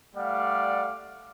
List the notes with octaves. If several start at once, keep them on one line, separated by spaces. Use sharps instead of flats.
G3 A3 D5 F5 F#5